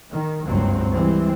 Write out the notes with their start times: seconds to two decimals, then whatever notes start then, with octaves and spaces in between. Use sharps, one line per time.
0.11 D#3
0.46 F#1 C#2 G2 F#3 C4
0.92 E3 G3 G#3 C4